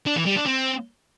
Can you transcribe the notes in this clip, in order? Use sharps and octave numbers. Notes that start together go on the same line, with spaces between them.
D4
E3
G3
D4
C4